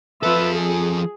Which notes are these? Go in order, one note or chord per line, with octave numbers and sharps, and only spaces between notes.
F3 F4 A4 B4 E5
G#4